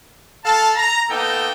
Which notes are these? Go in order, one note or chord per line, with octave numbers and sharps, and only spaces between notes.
A4 F5 A5
A#5
A#3 B3 D#4 A4 G5